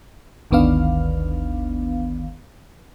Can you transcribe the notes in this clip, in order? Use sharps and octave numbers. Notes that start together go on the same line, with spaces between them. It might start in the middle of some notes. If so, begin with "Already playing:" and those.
G1 D2 D#3 B3 D4 F5